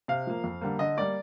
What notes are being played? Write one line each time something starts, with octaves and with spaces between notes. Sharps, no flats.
C3 F5
F3 A#3
F2
D3 G3 A#3
D3 D#5
G3 A#3 D5